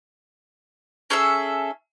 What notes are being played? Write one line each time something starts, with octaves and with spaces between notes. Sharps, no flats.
C#4 G#4 A4 E5